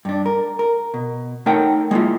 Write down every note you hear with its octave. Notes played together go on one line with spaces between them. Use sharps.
G2 D4
A#4
A#4
B2
A3 D#4 A#4 C#5 F#5 G5
G#3 A#3 E4 F4